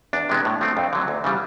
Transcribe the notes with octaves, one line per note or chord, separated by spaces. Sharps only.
E2 D4
C3 E3 G#3 B3
A2
F3 A3 C4
F2
D3 F#3
D2
C#3 E3 G3